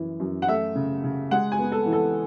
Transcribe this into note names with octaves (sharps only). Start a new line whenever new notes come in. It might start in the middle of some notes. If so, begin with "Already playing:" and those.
Already playing: F#2 E3
F#2
F#5
A3 E5
C#3
C#3
G#3 F#5
G#5
B3
A4
E3
A4